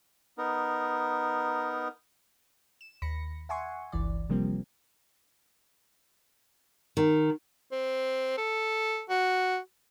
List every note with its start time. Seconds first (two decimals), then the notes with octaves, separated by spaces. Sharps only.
0.38 B3 D#4 A#4
2.81 E7
3.02 D#2 B5 A#6 C#7
3.49 E5 F#5 G#5 C6 C#6
3.92 G1 C#2 E3 D5
4.29 C3 F3 G3 A#3 C4
6.97 D#3
7.72 C4
8.38 A4
9.09 F#4